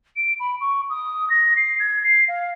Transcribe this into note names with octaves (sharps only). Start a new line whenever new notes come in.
D7
B5
C#6
D#6
A#6
C7
G#6
C7
F5